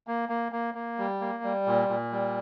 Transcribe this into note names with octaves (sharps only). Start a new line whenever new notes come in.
A#3
A#3
A#3
A#3
G3
A#3
G3
A#2
A#2
G3